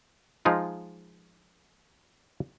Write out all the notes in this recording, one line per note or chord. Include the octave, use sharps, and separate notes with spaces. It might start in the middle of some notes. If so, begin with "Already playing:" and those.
F3 G#3 D#4 F4